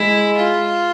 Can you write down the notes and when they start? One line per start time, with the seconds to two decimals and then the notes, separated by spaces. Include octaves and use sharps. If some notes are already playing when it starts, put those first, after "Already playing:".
Already playing: G#3 E4
0.37 F4